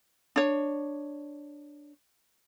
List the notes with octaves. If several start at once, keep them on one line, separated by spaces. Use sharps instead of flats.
D4 C#5